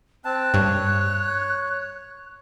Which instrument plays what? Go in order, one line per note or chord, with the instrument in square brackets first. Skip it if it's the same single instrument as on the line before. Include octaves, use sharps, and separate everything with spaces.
[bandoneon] C4 A5 [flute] F#6
[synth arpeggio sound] G2 [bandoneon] C#5